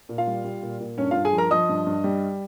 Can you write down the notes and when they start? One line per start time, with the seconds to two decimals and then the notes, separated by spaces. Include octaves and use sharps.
0.09 A#2
0.18 F4 F5
0.27 G3
0.44 G3
0.63 A#2
0.80 A#2
0.98 G2 C#4 C#5
1.11 F4 F5
1.16 G2
1.25 G#4 G#5
1.33 F3
1.38 A#4 A#5
1.51 F3 D#5 D#6
1.69 G2
1.87 G2
2.04 G3